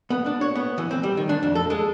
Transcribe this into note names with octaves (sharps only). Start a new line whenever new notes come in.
B3
D4
C#5
B3
E3
C4
G3
D#3
D4
F2
A4
G#3